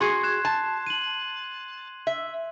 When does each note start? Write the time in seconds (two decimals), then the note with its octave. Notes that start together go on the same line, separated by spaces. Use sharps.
0.01 F#4 G#4 C6 C7
0.23 F#6 G#6 E7
0.45 A5
0.87 D#7 F#7
2.07 E5